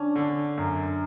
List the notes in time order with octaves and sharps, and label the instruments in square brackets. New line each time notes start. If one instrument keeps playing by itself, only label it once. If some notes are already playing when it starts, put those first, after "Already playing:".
Already playing: [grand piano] C#4 [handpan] D4
[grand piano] D3
F#2